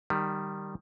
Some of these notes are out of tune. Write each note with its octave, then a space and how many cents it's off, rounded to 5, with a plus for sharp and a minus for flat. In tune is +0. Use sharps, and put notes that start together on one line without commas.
D#3 -20 G3 +0